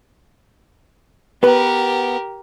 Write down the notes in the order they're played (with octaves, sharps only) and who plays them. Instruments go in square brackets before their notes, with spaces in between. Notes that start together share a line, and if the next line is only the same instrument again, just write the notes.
[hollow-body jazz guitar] B3 B4 [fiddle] G4 A#4